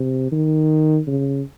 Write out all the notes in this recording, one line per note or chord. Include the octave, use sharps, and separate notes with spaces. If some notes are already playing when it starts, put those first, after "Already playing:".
Already playing: C3
D#3
C#3